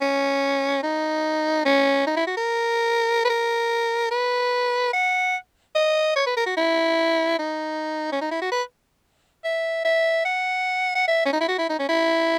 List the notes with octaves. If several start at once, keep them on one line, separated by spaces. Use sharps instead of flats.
C#4
D#4
C#4
D#4
E4
F#4
A#4
B4
A#4
B4
F#5
D#5
C#5
B4
A#4
F#4
E4
D#4
C#4
D#4
E4
F#4
B4
E5
E5
F#5
F#5
E5
C#4
D#4
E4
F#4
E4
D#4
C#4
E4